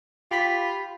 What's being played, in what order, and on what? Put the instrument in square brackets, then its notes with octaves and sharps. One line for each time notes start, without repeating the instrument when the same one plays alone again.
[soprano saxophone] F4 [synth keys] G4 B5 B6